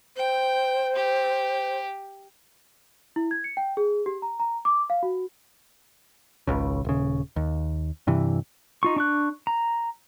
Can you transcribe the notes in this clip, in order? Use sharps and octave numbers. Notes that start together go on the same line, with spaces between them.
C5 G5
G4
E4
G#6
C#7
G5
G#4
G4
A#5
A#5
D6
F5
F#4
G#1 C#2 C#3
D#1 C#3
D#2
G2 C3 E3
D#4 F4 C#6
D4 C#6 F#6
A#5